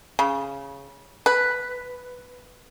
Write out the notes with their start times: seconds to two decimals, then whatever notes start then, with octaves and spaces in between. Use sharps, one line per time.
0.19 C#3
1.26 B4